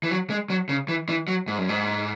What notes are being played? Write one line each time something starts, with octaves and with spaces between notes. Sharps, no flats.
E3
F#3
G#3
F#3
C#3
E3
E3
F#3
G#2
F#2
G#2